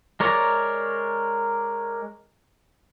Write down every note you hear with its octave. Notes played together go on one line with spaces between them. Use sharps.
G#3 A#4 C#5 D5 A#5